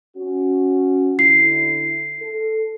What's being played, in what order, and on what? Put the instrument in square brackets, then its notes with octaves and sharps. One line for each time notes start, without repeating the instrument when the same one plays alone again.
[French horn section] C#4 F#4
[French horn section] D3 E4 [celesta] C7
[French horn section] A4